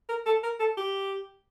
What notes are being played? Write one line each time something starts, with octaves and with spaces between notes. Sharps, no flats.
A#4
A4
A#4
A4
G4